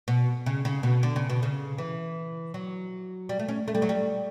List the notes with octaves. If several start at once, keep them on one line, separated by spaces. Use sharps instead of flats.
B2
C#3
C#3
B2
D3
C#3
B2
C#3
E3
F#3
G3
A3
C#4
A3
G3
F#3
G3